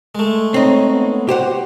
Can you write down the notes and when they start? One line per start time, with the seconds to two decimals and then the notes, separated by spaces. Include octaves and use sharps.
0.15 G#3 A3
0.54 C4 D#4 C#5
0.91 B3
1.29 F#4 G4 C5 F#5